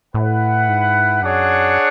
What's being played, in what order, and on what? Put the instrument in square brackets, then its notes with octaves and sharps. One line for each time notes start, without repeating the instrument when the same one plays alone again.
[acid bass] A2 [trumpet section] E4 B4 F#5
[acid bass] G#2
[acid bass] F#2 [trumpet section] D4 G#4 C#5 F#5